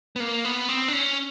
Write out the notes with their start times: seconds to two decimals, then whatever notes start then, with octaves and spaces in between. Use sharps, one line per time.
0.16 B3
0.20 A#3
0.45 B3
0.69 C4
0.88 D4
0.93 C#4